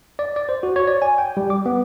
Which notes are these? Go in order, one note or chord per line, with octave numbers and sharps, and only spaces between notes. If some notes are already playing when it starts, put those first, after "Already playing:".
D5
D5
C5
F#4
C#5
D5
G#5
G5
G3
D6
B3